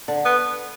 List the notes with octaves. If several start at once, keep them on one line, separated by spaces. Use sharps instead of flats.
D3
B3